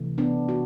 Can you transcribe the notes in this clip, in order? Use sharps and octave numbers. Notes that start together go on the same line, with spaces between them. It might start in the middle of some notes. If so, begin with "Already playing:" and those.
Already playing: C3 E3 A3
B3 D4
F#4